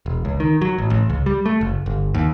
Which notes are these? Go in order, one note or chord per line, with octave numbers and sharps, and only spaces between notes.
E1
C#2
D#3
F#3
A1
A1
C#2
G3
A3
F#1
G1
D#2